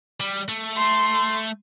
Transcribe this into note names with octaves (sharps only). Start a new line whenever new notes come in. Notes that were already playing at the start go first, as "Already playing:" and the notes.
G3
A3
C6